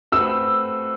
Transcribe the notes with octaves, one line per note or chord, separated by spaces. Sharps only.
A3 C4 F#4 B4 E6